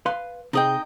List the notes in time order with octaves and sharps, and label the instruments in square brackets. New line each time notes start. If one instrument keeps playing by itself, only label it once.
[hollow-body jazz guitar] B4 F5 C6
[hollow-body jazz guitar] C3 G#4 [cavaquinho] D#4 D#5 G5